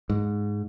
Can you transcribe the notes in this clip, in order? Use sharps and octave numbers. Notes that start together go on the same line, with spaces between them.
G#2